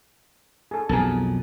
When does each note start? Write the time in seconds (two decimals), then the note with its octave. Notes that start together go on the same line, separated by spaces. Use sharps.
0.71 G#4 A4
0.89 B1 F2 G#4 A#4 A5